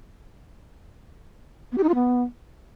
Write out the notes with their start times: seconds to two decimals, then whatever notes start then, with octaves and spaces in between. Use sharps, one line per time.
1.72 B3
1.78 G4
1.83 D#4
1.89 F4
1.94 B3